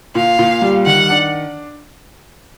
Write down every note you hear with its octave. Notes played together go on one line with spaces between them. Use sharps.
A#2 F5
A#2
G3
D#3 F#5
D4